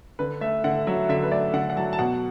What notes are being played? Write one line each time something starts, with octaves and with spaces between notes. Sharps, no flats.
D3 B4
A3 E5
D3 F#5
F#3 E5
D3 E5
B4
A3 D5
D3 F#5
F#5
F#3 A5
A5
B2 F#5